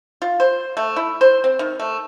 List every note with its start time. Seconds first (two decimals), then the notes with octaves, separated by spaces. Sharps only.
0.22 F4
0.40 C5
0.77 A3
0.96 E4
1.21 C5
1.44 C4
1.59 D#3
1.80 A3